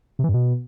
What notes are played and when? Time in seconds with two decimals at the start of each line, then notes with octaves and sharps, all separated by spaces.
0.19 C3
0.24 E3
0.29 G2
0.34 B2